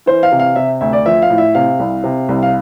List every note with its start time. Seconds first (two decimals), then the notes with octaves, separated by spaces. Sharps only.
0.06 E3 C5
0.23 F5
0.32 C3
0.40 F5
0.56 C3 E5
0.81 D2 E5
0.93 D5
1.06 F3 E5
1.22 F5
1.30 A2
1.38 E5
1.55 C3 F5
1.79 C2
2.04 C3
2.28 C2
2.43 F5